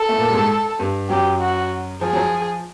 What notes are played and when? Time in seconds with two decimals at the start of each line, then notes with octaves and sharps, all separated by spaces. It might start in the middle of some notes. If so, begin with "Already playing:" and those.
Already playing: A4
0.09 A3
0.18 A#2 A#3
0.29 G3
0.34 G#2 G#3
0.79 G2 G3
1.10 F#2 F#3 G4
1.41 F#4
2.01 F3 G#4
2.13 F#3
2.16 F3